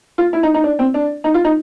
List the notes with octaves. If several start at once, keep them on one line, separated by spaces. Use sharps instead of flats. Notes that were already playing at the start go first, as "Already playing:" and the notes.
F4
E4
D#4
D#4
D4
C4
D4
D#4
F4
D#4